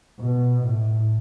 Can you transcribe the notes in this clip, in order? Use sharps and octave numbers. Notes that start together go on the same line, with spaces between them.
B2
A2